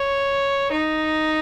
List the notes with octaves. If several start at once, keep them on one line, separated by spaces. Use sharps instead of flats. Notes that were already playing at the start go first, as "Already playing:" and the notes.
Already playing: C#5
D#4